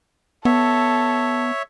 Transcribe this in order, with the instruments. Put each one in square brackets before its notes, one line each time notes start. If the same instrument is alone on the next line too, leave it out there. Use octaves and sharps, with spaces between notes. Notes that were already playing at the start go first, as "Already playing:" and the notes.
[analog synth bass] B3 [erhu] A4 [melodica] C#5 E5